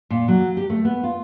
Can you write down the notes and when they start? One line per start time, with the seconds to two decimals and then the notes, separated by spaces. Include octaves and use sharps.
0.10 A#2
0.28 F#3
0.57 G4
0.70 A3
0.85 B3
1.03 F4